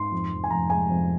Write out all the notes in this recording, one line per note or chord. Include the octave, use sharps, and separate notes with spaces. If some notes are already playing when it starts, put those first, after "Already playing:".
Already playing: G#2 C6
F2
F1
G#5
F1 A#5
G#3 G#5
F2